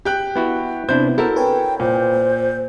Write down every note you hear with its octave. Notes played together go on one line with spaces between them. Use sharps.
G4 G5 F#6
B3 E4 F#4
C3 B3 C4 D4 E4 C5 G6
E4 F#4 A4 A#4 E5
B4 C#5 G5 G#5
A#2 C5